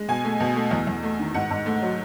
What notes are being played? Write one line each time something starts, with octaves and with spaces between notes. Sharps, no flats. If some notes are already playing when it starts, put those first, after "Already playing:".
Already playing: G#3
B2 G#5
A3
B2
A3
E2
E2
A3
D#3
G#2 F#5
G#2
A3
F#3